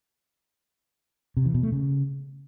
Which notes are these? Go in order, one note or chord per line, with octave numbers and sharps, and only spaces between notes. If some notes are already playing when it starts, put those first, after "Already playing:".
C3
E3
B2
A3
C#3